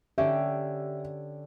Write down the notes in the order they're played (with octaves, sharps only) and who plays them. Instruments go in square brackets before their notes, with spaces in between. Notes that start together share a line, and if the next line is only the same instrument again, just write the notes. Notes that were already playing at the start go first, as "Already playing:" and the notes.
[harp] D3 C#4 G4 [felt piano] E5